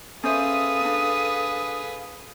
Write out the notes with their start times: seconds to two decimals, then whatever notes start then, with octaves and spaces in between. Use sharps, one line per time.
0.24 C#4 G#4 A4 B4 C5 E5 F5 D#6
0.85 D4